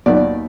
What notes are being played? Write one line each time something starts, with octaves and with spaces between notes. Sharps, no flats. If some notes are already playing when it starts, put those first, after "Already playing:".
D#2 D#3 F#3 B3 D5